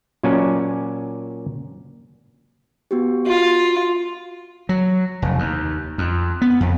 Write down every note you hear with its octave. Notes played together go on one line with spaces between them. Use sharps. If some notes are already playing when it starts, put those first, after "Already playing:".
A#2 F#3 C#4 D5 G#5 A5
B3 F#4 G4
F4 F#4
F#3
F1
D#2
F2
B3
F2